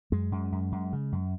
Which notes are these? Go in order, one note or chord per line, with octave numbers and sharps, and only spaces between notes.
F#2 G#3
F#2
F#2
F#2
C#3
F#2